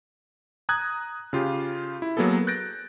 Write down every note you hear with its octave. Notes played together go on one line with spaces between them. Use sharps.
A#5 D#6 F#6 G#6
C#3 F4 G4
E4
F#3 A#3 B3 G#4 A4
F#6 G6 A6 A#6 D7